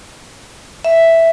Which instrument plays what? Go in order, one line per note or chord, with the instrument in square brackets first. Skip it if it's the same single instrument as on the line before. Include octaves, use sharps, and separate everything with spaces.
[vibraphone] E5